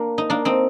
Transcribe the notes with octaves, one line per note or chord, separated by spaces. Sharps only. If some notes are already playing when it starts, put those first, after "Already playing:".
Already playing: A#3 D4
D#4
A#3 D4
C4 D#4